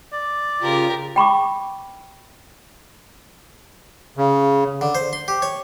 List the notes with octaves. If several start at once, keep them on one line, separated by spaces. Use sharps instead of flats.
D5
C#3 F4 G4 A#4
G5 B5 C#6 D6
C#3
D3
C5
C6
G4
C#5